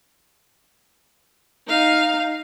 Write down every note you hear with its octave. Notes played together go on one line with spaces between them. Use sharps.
D#4 F5